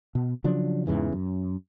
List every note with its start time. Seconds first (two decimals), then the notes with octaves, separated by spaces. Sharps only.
0.15 B2
0.44 C#3 F3 F#3 D4
0.87 E2 G#2 C#3 E3
1.12 F#2